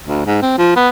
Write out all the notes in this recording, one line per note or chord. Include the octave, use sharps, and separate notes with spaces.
D2
G#2
C4
F3
B3